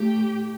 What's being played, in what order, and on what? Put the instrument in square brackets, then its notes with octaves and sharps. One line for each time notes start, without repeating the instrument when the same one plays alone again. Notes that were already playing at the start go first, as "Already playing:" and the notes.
Already playing: [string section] A2 A3 G4